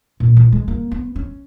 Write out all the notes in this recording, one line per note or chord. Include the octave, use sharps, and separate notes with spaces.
A#2
E3
G#3
A#3
B3
C#4